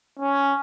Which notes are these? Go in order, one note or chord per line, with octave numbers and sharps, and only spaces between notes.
C#4